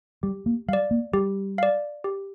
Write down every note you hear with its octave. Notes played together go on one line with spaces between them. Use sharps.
G3 G4
A#3
G3 D5 F5
A#3
G3 G4
D5 F5
G4